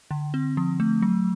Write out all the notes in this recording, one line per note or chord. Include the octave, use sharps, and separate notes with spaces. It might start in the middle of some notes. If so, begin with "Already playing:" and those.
D3
C4
F3
A3
F#3